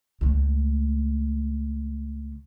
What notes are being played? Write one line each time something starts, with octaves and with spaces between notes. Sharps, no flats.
C#2 A3